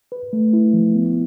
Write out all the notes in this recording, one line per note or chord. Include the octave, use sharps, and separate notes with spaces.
B4
A3
E4
F3
B3